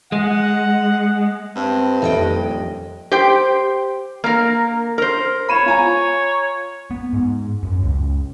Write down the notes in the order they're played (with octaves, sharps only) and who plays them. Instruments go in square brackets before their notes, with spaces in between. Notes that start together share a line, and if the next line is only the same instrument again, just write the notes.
[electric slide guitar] G#3 [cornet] F#5
[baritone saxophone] G2 [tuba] C4
[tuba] D#1 [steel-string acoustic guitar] F2 D#5 G5 [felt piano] A4 E5
[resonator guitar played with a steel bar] G4 C5 G5
A#3 A#4
A#4 C5
[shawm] C#5 [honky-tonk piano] B5 D#7 E7
[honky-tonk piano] F4 G#5 A#5
[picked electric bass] B3
G#2
F#2
C#2